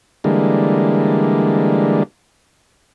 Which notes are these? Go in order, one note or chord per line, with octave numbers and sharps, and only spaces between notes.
D3 E3 G3 G#3 A#3